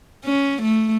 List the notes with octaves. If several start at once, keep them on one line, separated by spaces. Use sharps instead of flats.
C#4
A3